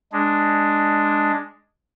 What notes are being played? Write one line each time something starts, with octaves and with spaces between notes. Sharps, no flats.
G#3 D4